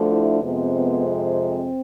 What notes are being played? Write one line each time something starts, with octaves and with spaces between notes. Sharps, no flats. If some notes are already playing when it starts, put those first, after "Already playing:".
Already playing: D2 D3 F3 A3
E4
F2 C3 G#3 B3
B3
C4